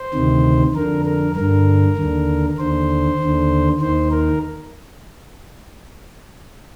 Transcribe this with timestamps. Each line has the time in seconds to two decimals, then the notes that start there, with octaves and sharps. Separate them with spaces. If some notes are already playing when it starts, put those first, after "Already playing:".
Already playing: C5
0.14 D2 C3 D#3
0.75 F2 D3 A#4
1.05 A#4
1.36 G2 D3 A#4
1.97 D#2 D3
2.58 D#2 D3 C5
3.19 D#2
3.24 D3
3.80 D#2 D#3 C5
4.11 A#4